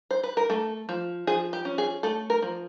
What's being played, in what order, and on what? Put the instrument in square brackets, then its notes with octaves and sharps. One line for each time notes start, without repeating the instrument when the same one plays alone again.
[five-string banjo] C5
B4
A#4
A3 A4
F3
F3 G#4
G4
C#4
G#4
A3 A4
A#4
F3